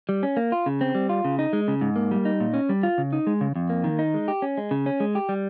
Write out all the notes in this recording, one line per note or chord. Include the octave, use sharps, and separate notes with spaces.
G3
C#4
A#3
F4
C#3
C4
G3
F4
C#3
D#4
G#3
C#3
G#2
A#3
G3
D#4
A#2
C#4
G3
F4
C#3
D#4
G#3
C#3
F2
A#3
D#3
D#4
G#3
G4
C#4
G#3
C#3
C#4
G#3
G4
G3